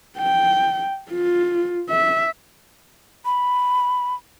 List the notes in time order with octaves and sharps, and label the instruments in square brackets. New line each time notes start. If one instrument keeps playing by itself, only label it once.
[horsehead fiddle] G5
F4
E5
[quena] B5